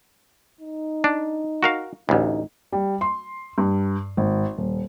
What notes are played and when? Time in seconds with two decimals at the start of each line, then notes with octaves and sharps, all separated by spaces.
0.61 D#4
1.04 D4
1.63 F#4 A#4 F5
2.09 A1 D2 D#4
2.72 G3
3.01 C6
3.58 G2
4.17 G#1
4.57 D#1